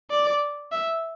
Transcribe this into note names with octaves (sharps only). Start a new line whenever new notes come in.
D5
E5